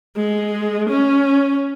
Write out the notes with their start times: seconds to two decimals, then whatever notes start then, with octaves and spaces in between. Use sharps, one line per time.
0.16 G#3
0.90 C#4